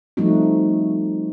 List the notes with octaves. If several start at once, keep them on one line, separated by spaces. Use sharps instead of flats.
F3 G3 A3 C4 D#4 F#4